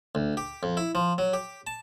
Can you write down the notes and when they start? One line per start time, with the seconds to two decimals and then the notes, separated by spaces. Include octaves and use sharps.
0.15 D2
0.37 G4
0.63 F2
0.77 E4
0.95 F3
1.18 F#3
1.33 G4
1.67 A5